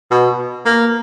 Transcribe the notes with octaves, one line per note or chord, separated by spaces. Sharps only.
B2
A#3